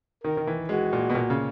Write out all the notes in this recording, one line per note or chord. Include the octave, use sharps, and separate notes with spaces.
D#3 A#4
D#3
E3
G#3 F#4
A#2
B2
A#2
C#3